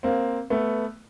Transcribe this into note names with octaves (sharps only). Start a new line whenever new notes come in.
A#3 C4
A3 B3